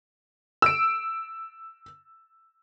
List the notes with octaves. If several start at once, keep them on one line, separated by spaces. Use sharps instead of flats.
E6 D7